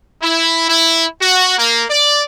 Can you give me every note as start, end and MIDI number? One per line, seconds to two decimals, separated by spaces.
0.23 0.68 64
0.69 1.05 64
1.22 1.57 66
1.59 1.84 58
1.90 2.22 74